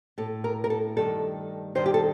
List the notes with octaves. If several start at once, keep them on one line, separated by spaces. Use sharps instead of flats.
A2 A4
A#4
A#4
A4
G2 D#3 A4
G2 D#3 C5
G4
A4